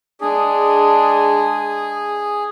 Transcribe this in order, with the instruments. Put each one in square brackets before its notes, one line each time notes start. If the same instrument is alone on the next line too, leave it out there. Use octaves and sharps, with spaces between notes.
[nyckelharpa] G#3 D4 [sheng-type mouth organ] G#4